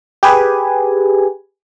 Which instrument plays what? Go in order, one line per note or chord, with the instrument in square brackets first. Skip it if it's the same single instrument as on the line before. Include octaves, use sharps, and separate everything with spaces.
[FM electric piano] G4 G#4 B4 G#5